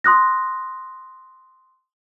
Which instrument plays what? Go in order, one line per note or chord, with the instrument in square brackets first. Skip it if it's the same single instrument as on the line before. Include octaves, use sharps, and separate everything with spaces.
[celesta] C6 D#6 F#6 A#6